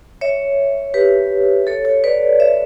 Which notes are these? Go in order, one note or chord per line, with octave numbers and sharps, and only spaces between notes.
C#5 E5
G4 B4
A4 C#5
A4 C#5
B4 D5
C#5 E5